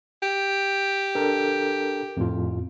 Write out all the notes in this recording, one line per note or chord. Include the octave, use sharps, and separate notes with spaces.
G4
D4 A4 A#4
F2 A2 F4